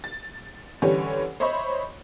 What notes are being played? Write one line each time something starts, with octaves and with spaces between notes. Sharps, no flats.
A6
D3 E3 G3 C#4 G4 C#5
C5 C#5 D#5 E5 B5 C#6